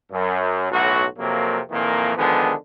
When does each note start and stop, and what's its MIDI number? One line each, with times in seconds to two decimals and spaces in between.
0.12 0.69 42
0.71 1.05 35
0.71 1.05 45
0.71 1.05 54
0.71 1.05 66
1.18 1.59 41
1.18 1.59 48
1.18 1.59 54
1.18 1.59 58
1.70 2.14 41
1.70 2.14 46
1.70 2.14 51
1.70 2.14 52
1.70 2.14 58
2.17 2.53 50
2.17 2.53 51
2.17 2.53 53
2.17 2.53 56
2.17 2.53 59